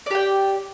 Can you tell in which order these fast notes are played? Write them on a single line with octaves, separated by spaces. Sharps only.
D5 G4 G5